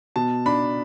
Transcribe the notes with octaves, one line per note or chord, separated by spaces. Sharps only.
B2 A5
D4 B5